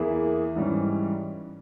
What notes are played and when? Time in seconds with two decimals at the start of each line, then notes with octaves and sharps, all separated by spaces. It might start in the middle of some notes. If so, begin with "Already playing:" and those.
Already playing: E2 E3 A#3 E4 G#4
0.55 G#2 E3 G3 C#4